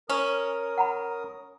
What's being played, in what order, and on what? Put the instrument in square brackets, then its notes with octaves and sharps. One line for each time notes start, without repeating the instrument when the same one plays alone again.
[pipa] C#4 [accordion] A#4 D#6
[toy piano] F#5 A#5 B5